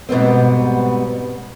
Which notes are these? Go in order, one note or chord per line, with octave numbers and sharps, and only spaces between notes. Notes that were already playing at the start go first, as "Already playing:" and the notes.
G#2 B2 G3 B3 C4